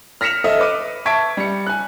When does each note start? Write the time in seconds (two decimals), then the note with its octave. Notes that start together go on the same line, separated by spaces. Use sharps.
0.21 F6 A#6 B6 C#7 E7 F7
0.44 A4 D#5 E5 A5 F6
0.59 B4 D6 D#7
1.05 E5 A5 C#6 G#6 B6 D7
1.37 G3 C#7
1.67 G#5 F#6